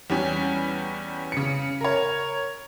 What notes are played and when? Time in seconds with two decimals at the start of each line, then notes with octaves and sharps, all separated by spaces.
0.10 E2 G3 C#4
1.32 C#3 C#7
1.81 A#4 C#5